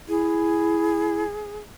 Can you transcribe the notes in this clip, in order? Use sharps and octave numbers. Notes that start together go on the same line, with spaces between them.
E4 G#4